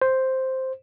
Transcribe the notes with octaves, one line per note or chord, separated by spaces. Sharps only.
C5